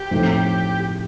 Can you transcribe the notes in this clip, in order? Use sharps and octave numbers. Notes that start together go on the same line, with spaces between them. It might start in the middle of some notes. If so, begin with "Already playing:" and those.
Already playing: G4
A2 F3 A3 C4 D#4